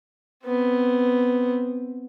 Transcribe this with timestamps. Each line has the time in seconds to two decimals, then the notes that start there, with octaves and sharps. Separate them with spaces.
0.44 B3 C4